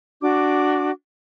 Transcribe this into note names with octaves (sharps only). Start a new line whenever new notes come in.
D4 F#4 D6